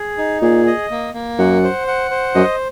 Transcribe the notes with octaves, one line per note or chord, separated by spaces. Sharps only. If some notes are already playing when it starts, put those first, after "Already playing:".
Already playing: G#4
D#4
A#2 G#4
D#5
A#3
A#3
F#2 F#5
C5
F#5
C5
F#2 D#5